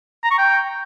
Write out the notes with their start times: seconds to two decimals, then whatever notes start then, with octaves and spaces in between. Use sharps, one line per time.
0.24 A#5
0.31 C#6
0.38 G5